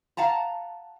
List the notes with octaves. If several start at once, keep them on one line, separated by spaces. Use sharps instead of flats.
F5 F#5 A5 A#5